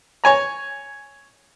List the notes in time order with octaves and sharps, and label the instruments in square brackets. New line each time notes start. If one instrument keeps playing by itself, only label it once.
[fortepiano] C#5 G#5 A#5